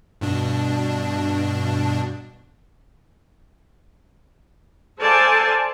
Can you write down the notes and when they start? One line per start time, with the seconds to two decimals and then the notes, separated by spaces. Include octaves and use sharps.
0.21 G2 B2 D4
5.00 A4 C5 D5 F5 G#5 A5